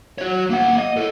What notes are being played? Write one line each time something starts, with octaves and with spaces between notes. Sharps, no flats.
F#4 C#5
A#3 F#5
D#5
A4 C#5